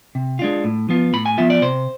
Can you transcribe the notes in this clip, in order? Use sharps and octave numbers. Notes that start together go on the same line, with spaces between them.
C3
G#3 D4 F4
A2
F3 B3 F4
A2 B5
G#5
F3 B3 F4 E5
D5
C3 C5